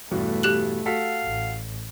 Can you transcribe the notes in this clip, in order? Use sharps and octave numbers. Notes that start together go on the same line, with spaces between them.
E2 G2 B2 A3
G4 F#6 F#7
F#4 A4 F5 B6
A1